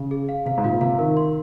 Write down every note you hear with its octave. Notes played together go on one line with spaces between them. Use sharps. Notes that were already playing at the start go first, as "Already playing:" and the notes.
Already playing: C#3
G#4
F5
C3 F5
G#2
A#2 F4
C3 F5
D#3 A#4
C6